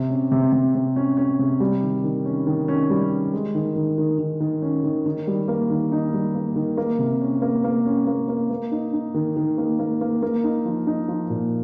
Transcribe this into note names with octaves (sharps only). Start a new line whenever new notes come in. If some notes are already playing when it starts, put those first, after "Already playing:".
Already playing: C3
C#4
C3
C3
C3
C#4
C#4
C3
G3
D#3
D#3
C#4
D#3
C#4
G3
C#4
G#3
D#3
D#3
D#3
D#3
D#3
C#4
D#3
D#3
G3
A#3
D#3
D#4
G3
A#3
D#3
A#3
C3
C#4
A#3
A#3
C#4
A#3
A#3
A#3
D#4
D#4
D#3
D#3
A#3
A#3
A#3
A#3
D#4
F3
D#4
F3
A#2